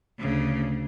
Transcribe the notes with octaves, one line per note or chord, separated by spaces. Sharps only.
D2 C#3